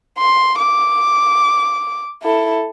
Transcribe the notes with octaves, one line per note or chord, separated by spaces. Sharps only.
C6
D6
E4 A4